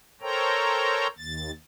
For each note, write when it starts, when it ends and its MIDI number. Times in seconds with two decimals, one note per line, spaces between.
0.21 1.07 69
0.21 1.07 70
0.21 1.07 72
0.21 1.07 73
0.21 1.07 79
0.21 1.07 82
1.18 1.51 39
1.18 1.51 93